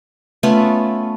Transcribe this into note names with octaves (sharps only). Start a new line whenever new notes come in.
A3 B3 C#4 F4